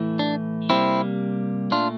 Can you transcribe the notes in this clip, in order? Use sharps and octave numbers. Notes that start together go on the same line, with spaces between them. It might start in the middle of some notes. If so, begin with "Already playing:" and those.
Already playing: A2 E3 A3
D4
C3 G3 A#3 C4 E4
A#2 A3 D4 F4